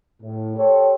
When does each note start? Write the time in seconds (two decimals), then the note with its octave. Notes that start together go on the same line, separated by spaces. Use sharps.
0.22 A2
0.56 G4 A4 C5 C#5